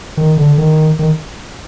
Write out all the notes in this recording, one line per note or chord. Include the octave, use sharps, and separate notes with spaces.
D#3
D3
D#3
D#3